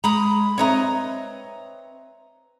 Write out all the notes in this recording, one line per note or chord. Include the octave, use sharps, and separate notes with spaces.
G#3 A#5 B5 D#6
C4 B4 C#5 D#5 E5 A#5